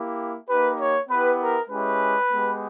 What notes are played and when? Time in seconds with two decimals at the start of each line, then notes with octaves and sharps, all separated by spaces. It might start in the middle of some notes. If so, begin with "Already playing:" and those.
Already playing: A#3 E4 G4
0.48 A#3 D#4 G4 B4
0.78 C#5
1.08 B3 E4 G4 B4
1.39 A#4
1.69 G#3 C#4 E4 G4 B4
2.30 G#3 B3 G4